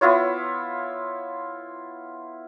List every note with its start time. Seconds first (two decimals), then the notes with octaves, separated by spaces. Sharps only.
0.01 B3 E4 F4 C#5